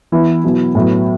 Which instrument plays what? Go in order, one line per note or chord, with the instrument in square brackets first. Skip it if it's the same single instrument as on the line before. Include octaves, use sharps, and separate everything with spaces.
[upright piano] E3 B3 E4
B2 F#3 B3 E4
A2 F#3 B3